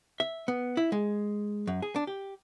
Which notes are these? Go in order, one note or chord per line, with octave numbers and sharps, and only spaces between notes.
E5
B3
E4
G#3
F#2
G#4
D4
G4